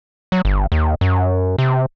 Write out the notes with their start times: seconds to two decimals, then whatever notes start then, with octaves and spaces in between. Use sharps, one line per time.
0.32 F#3
0.45 G1
0.72 D#2
1.01 F#2
1.58 C3